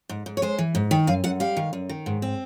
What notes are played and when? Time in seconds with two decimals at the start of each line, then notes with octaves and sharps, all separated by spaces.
0.09 G#2
0.26 G#2
0.37 C#5
0.42 G#3 C5
0.59 E3
0.75 G#2
0.91 D#3
1.07 F#2 F5
1.24 F#2 F#5
1.40 G3 F5
1.57 D#3
1.73 F#2
1.89 D#3
2.06 G#2
2.22 C4